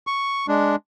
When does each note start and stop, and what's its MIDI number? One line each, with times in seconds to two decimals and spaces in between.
0.07 0.46 85
0.48 0.76 56
0.48 0.76 62